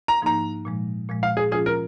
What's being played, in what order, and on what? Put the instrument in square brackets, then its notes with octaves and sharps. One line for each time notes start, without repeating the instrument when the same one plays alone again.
[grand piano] A#5
[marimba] G#2 F3 A#3 D#4 [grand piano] A#5
[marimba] A#2 F3 G#3
A#2 F3 G#3
[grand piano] F5
G#4
[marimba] F3 C#4 F4 [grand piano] G#4
[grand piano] A#4